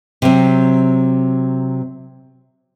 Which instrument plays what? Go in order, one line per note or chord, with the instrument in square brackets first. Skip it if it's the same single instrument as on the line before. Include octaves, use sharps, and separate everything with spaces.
[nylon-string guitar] C3 F#3 C4